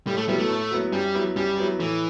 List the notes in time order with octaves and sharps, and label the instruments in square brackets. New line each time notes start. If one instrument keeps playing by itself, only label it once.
[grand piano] A2 [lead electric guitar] G3
[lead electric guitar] A3
[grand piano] F#3 B3 E4 [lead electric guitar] G3
[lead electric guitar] A3
[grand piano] A2
F#3 B3 E4
[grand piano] F#2 [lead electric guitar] G3
[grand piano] F#3 B3 E4
[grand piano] F#2 [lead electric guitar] G3
[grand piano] F#3 B3 E4
[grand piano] A2 [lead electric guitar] E3